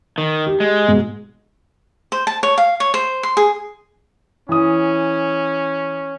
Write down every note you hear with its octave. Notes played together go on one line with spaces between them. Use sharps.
D#3
G4
G#3
G#2 B2
C5
A5
C#5
F5
C#5
C5
C6
G#4
E3 C#4 D#6